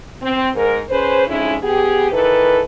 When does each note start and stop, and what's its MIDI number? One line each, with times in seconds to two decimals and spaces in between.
0.22 0.49 60
0.55 0.80 44
0.55 0.80 70
0.89 1.25 61
0.89 1.25 68
0.89 1.25 71
0.89 1.25 72
1.27 1.56 41
1.27 1.56 56
1.27 1.56 61
1.27 1.56 63
1.27 1.56 64
1.62 2.09 59
1.62 2.09 67
1.62 2.09 68
2.11 2.62 51
2.11 2.62 52
2.11 2.62 69
2.11 2.62 71